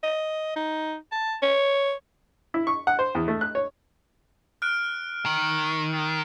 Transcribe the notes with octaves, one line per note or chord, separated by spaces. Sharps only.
D#5
D#4
A5
C#5
E4
C#6
F#5
C5
E2
A3
F#6
C#5
F6 F#6 D7
D#3